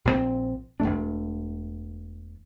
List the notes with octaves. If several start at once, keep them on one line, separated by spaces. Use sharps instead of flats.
A#1 A#2 C#3 C4
E1 A2 A3 D4